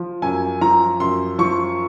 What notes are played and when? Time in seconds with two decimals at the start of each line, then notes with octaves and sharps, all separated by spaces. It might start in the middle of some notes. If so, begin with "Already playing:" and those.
Already playing: F3
0.22 F#2 G#5
0.61 F3 A#5
1.00 F#2 C6
1.39 F3 C#6